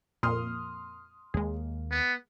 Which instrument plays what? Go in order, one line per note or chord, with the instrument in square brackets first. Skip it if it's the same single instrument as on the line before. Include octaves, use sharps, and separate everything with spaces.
[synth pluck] F2 A#2 A#3 [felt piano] C6 D#6 F6
[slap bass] D#2 A#3 [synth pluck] G#3 G#4
[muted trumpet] B3